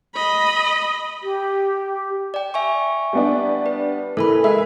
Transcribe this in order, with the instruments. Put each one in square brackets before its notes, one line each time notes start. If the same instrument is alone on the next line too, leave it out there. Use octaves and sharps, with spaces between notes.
[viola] D#5 B5
[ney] G4
[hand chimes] D5 G5
E5 G#5 C#6
[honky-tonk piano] G3 B3 D4
[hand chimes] B4
[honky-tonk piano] E3 [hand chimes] A4 A#4 B5
[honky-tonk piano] G#3 E5 [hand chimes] B5